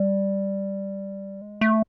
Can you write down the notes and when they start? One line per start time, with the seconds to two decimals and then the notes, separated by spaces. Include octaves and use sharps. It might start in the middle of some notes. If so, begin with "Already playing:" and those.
Already playing: G3
1.41 G#3
1.61 A3